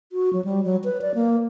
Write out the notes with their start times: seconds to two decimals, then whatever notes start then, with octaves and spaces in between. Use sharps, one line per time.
0.12 F#4
0.33 F#3
0.45 G3
0.64 F#3
0.84 B4
1.01 D5
1.15 A#3